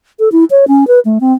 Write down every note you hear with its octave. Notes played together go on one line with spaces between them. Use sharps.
A4
E4
C#5
C#4
B4
A3
C4